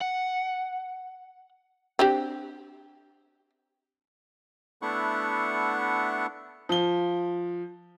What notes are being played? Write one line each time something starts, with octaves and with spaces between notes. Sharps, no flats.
F#5
C4 D4 G4
A3 B3 D4 E4 F#5 C#6
F3 G7